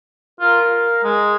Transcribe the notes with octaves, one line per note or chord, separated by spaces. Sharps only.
F4 A#4
F5
G#3